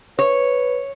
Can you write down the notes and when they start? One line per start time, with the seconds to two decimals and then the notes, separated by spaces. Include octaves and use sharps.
0.19 B4 C#5